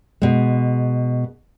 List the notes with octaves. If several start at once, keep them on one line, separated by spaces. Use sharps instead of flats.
B2 G#3